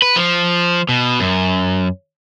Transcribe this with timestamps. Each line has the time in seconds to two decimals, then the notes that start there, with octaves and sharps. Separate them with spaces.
0.02 B4
0.16 F3
0.89 B2
1.20 F#2